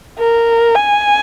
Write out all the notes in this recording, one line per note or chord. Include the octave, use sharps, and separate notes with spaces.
A#4
G#5